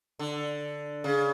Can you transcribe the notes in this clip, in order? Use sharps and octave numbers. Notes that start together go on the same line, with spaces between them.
D3
C#3